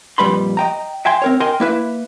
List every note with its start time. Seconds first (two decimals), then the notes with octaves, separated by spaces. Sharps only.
0.18 F2 A#2 G3 B4 B5 C6
0.57 D#5 G5 A#5
1.05 E5 G5 G#5 C6
1.22 C4 A#4 C#5
1.40 A#4 D#5 G5 G#5 C6
1.60 A#3 E4 B4 E5